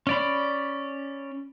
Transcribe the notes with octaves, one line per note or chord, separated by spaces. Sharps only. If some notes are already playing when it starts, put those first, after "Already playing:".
C#4 D5 B5